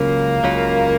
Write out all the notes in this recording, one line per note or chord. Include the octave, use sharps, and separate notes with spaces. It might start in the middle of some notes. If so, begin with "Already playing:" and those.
Already playing: C#2 C#3 F#3 A#3 C#4 F4
C#2 C#3 F#3 C#4 F4